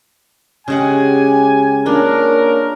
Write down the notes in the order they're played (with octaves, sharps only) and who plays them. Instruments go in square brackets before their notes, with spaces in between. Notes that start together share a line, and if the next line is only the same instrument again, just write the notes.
[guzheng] C#3 G#3 F#5 [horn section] G4 G#5
[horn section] A#3 C#4 A#4 [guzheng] D4 F4